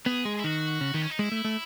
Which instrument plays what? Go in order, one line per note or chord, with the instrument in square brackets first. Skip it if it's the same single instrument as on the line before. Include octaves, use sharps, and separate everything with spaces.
[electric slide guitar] B3 [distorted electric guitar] G#4
[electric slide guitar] G#3
[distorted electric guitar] E4
[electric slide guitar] D#3 [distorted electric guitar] F#4
[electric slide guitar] C#3
[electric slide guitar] D#3 [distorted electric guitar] B3
[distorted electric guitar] C#4
D#4
[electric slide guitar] G#3 [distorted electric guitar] E4
[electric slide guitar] A3
A3